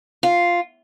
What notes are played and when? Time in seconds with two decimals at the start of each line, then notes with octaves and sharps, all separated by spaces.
0.23 F4